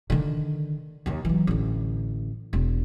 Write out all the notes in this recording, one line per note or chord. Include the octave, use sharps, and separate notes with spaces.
D3 D#3
D#2 D#3
E3 F#3
A1 D3
E1